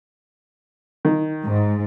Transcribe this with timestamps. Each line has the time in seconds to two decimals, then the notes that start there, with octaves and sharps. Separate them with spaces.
1.05 D#3
1.44 G#2